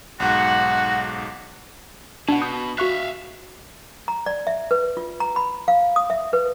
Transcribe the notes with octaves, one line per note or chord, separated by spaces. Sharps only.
B1 G#2 F#4 F#5
B2 D4 F#5
D#6 G6
F#4 E5 F5 C#6 F#6
A#5
D5
E5
B4
F4
A#5
B5
F5
D#6
E5
B4